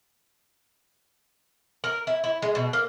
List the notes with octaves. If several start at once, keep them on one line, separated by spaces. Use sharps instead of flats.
A#4
E4
E4
G#3
B2
A#3